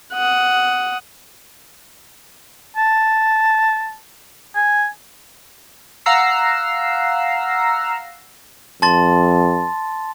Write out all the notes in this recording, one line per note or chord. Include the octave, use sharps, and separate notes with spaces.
F#5 D#6
A5
G#5
F5 F#5 A#5 E6 C7
F2 A5 C6 A6